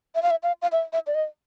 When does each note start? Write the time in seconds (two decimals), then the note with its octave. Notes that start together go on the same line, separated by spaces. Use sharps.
0.15 E5
0.23 F5
0.31 E5
0.43 F5
0.62 F5
0.72 E5
0.93 E5
1.07 D5
1.15 D#5